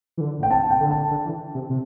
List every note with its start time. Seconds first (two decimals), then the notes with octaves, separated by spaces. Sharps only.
0.18 E3
0.21 D3
0.39 A2 G5
0.50 C3 A5
0.71 G5
0.80 D3
0.91 A5
1.11 D3
1.25 E3
1.55 C3
1.70 C3